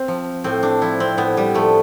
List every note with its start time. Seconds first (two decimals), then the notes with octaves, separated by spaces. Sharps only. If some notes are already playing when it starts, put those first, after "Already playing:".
Already playing: C4
0.08 F3
0.44 A2 C4
0.63 D4
0.81 F3 E4
1.00 C4
1.17 A2 B3
1.37 G3
1.54 F3 A3